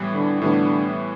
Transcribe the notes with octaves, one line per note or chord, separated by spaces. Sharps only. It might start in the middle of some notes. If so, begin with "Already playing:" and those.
Already playing: A2 E3 G3 B3
D3
A2 D3 E3 G3 B3